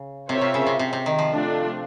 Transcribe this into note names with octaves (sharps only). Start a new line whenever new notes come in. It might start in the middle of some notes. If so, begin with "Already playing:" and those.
Already playing: C#3
C3 C4 F4 A#4 C#5 E5
C3
C#3
C3
C3
C3
D#3
F3
A3 D4 F4